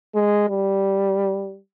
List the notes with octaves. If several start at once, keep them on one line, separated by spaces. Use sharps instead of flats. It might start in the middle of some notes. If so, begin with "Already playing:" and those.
G#3
G3